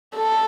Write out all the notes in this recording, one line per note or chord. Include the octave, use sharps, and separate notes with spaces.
A4